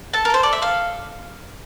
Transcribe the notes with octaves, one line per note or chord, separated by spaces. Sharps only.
A4 A5
A#4
A4 C5
A4 D5
E5
A4 F5